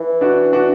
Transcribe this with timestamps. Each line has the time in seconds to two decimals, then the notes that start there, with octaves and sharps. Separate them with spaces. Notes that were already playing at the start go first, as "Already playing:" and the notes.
Already playing: E3
0.21 D4 F#4
0.53 D4 F#4